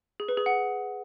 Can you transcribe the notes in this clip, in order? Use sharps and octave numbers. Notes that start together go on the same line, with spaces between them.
G#4
B4
G#4
F#5